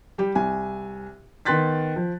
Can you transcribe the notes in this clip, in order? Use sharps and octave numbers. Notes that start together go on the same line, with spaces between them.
G3 G4
C2 G#5
D#3 B3 C6 F#6 A6 B6
F3